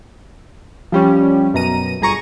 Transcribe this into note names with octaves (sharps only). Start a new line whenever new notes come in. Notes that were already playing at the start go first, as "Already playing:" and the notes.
F3 G3 C#4
F#2 B2 A#5 D#7
G1 G#4 A#5 C#6 D#7